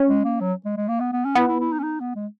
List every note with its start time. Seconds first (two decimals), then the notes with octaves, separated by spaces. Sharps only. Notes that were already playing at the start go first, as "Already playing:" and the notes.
Already playing: C#4
0.09 G#3
0.24 A#3
0.40 F#3
0.65 G#3
0.77 G#3
0.88 A#3
1.00 B3
1.13 B3
1.25 C#4
1.35 B3 E4
1.48 E4
1.60 E4
1.72 D#4
1.79 C#4
1.84 D#4
2.00 B3
2.15 G#3